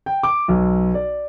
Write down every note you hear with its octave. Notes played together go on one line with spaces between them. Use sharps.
G5
D6
B1
D5